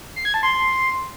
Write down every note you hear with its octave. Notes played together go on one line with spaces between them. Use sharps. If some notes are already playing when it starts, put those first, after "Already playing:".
C7
G#6
A5
C6